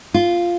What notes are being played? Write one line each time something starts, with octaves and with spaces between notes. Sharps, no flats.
F4